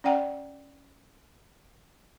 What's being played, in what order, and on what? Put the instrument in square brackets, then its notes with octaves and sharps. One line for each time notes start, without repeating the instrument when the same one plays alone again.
[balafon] C#4 D5 F#5 G5 A#5